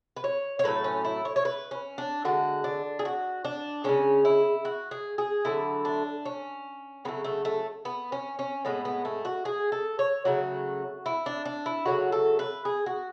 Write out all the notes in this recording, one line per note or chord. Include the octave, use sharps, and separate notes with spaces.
B4
C#5
C#5
A2 F#3 A3 B4
C#4
E4
C#5
C#5
B4
C#4
D4
D3 G#3 F#4
D4
G#4
F#4
D4
C#3 G#3 C#4
E4
F#4
G#4
G#4
D3 F#3 A3 E4
D4
C#4
C#3 F#3 A3 B3
A3
A3
B3
C#4
C#4
A2 G#3 B3
B3
A3
F#4
G#4
A4
C#5
C#3 F#3 A3 F#4
E4
D4
D4
E4
C#3 F#3 A3 F#4
A4
B4
G#4
F#4